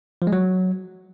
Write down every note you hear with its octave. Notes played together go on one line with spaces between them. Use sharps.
F3
G#3
F#3